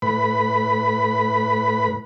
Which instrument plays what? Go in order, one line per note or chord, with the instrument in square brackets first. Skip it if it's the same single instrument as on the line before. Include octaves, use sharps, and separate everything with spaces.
[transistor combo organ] A2 B4 B5